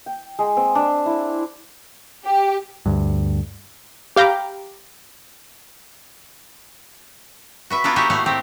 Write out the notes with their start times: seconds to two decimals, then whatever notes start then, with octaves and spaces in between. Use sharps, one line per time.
0.06 G5
0.39 G#3
0.57 C4
0.75 D4
1.06 E4
2.24 G4
2.86 D2 G2
4.16 G4 F5 G5 A#5 B5 D6
7.70 F#4 B4 E5
7.84 A#3 B3 D4 F4 A4 A#4
7.96 D#4 F#4 G4 E5 F#5 G#5
8.10 A2 A3 A#3 D#4 F5 F#5
8.26 C4 G4 A#4